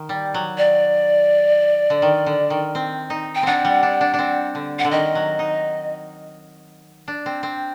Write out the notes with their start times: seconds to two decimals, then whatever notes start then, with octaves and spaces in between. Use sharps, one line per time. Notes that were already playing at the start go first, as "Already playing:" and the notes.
Already playing: D#3
0.09 G3
0.34 F#3
0.58 D5
1.90 D3
2.02 D#3
2.26 D3
2.50 D#3
2.75 C4
3.10 D#4
3.35 G5
3.43 C4 D4 F#5
3.65 G3
3.83 D4
4.01 D4
4.14 D4
4.19 C4
4.55 D3
4.79 F#5
4.85 D3
4.91 D#3 D#5
5.15 F#3
5.39 D#4
7.08 D4
7.26 C4
7.43 C4